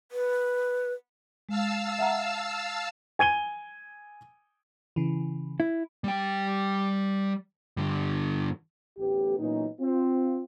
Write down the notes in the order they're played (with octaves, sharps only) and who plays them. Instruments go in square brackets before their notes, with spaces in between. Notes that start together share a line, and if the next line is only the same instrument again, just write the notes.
[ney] B4
[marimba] G#3 [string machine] F5 A5 E6
[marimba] E5 F#5 A#5
[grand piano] G#5 G#6 D#7 G7
[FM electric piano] C#3 E3
[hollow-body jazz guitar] E4
[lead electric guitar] G3 G5
G2 D3
[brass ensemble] A1 D2 A2 B3 G4
A#2 E3 F#3 B3 C#4 D#4
C4 F4